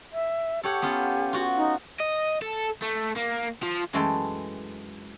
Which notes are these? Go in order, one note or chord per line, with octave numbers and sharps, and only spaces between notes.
E5
G4 A4 C#5 F#5
B3 C#4 F4
F4 F#4
D#4
D#5
A4
A3
A#3
F3
F#2 E3 G#3 A3 A4 G5